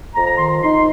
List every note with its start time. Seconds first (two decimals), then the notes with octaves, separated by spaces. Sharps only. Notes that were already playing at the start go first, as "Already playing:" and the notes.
0.15 F2 A#5
0.26 A#5
0.38 D#3 C6
0.62 D#4 C6